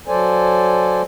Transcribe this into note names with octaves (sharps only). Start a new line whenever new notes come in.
F#3 A4 C5 D5 G#5